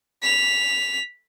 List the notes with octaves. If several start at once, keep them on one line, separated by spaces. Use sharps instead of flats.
B6 F7